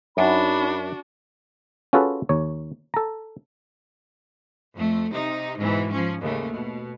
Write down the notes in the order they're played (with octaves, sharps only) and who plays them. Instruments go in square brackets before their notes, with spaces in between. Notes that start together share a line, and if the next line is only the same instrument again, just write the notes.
[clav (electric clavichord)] F#2 [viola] D4 F#4 [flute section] D#4 B5
[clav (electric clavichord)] C#4 F4 F#4 G#4 A4 B4
D#2 C#5
A4 A#5
[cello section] F2 A3
C3 D#4
G#2 B2 E3
F3 C#4
D#2 C#3 A3
B2